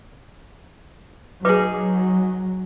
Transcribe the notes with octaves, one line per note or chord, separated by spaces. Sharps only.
F#3 D#4 G#4 B4 D6